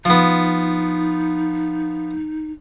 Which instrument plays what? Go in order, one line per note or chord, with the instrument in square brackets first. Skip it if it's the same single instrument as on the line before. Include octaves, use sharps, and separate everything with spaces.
[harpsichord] F3 B3 [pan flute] D#4